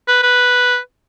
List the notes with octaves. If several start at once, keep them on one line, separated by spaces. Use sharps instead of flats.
B4
B4